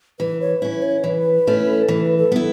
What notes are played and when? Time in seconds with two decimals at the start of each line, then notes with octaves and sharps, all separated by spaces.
0.19 E3 B4
0.41 C#5
0.61 C#4 E4 B4
0.82 C#5
1.04 E3 B4
1.47 A3 C#4 E4
1.88 E3 B4
2.18 A4
2.32 B3 E4